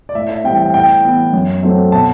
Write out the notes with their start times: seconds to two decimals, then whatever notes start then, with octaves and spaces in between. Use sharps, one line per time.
0.09 D5
0.15 A2 E5
0.30 E5
0.44 E3 G3 C4 G5
0.59 G5
0.74 A2 G5
1.04 E3 B3
1.33 F#2
1.63 F#3 A3 C4
1.92 B2 A5